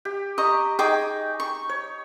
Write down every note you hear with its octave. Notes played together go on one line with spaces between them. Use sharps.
G4
D#5 A#5 C#6
D#4 G#4 G5 D6
C#6
C#5